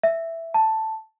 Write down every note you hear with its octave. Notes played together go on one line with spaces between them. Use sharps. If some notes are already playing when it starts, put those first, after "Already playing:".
E5
A5